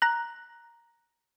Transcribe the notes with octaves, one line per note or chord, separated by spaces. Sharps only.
A#5 F#6